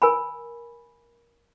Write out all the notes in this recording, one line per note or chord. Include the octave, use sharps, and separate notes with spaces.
A#4 G#5 B5